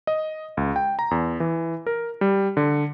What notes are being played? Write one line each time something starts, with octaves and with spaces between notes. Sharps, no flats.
D#5
C#2
G5
A#5
E2
E3
A#4
G3
D3